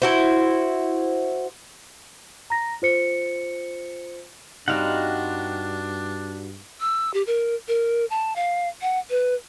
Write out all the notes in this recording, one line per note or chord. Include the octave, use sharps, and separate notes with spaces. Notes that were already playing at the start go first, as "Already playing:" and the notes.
E4 F#4 C5
A#5 A#6
F4 C5 C#7
G2 G3 C4 D4 D#4 F#4 F5 F#5
E6
G4
A#4
A#4
A5
F5
F#5
B4